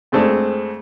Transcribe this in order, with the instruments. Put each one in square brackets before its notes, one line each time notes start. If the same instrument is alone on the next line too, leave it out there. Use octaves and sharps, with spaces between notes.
[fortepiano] F2 G#3 A3 C4 D4